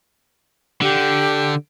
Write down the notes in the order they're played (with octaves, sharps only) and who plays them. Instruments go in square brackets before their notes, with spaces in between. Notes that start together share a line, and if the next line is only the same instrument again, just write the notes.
[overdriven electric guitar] D3 [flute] G4